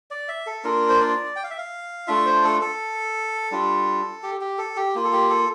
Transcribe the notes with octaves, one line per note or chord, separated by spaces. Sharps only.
D5
E5
A4
A#3 D4 F4 A#4
C5
D5
G5
F5
E5
F5
A3 D4 F4 E5
C5
A4
A4
G3 D4 F4
G4
G4
A4
G4
A#3 F4
A4
G4
A4